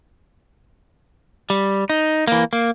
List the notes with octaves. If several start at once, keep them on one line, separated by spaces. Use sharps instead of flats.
G3
D#4
E3 A#3
A#3